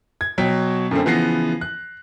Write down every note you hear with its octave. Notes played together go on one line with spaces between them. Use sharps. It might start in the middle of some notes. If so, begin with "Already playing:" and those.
G#6
B2 F#3 G5 B6
F#2 D3 A3 C4
C#3 E3 F3 B3 A#6 C7
F#6